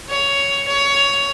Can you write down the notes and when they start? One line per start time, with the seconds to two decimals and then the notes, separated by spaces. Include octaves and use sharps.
0.09 C#5
0.67 C#5